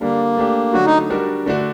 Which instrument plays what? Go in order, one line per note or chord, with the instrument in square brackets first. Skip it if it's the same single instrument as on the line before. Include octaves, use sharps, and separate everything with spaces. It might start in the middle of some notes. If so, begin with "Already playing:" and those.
[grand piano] D3 G3 D4 [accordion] A#3
[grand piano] A3 D4 G4
[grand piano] D3 F#3 A3 D4 [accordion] F#4
[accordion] D#4
[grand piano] G3 D4 F#4 A#4
D3 A3 D4 F#4